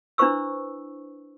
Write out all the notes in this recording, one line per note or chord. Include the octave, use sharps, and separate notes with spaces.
D4 E4 B4 C5 C#6 E6